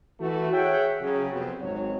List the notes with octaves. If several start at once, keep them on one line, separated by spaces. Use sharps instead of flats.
E3 A3 F#4
G#4 C#5 E5 F#5 G5
C#3 F#3
F2 C3 B3 C4
G#1 F#3 C#5